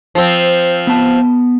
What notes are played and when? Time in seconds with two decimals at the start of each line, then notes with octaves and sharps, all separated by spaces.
0.15 F3 C4
0.87 B3 A5